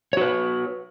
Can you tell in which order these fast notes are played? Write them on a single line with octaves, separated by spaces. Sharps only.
C#5 F#4 B4